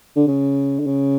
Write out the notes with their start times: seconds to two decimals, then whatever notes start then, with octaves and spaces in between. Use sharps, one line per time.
0.16 D3
0.27 C#3
0.79 D3
0.86 C#3